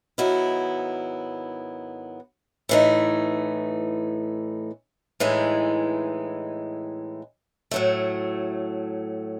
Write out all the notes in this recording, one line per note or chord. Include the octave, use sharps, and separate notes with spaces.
G#2 D#3 F#3 B3 E4
A2 E3 A3 D#4
A2 E3 G#3 D#4
A2 F#3 A3